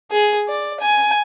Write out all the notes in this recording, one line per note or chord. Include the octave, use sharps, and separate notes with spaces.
G#4
D5
G#5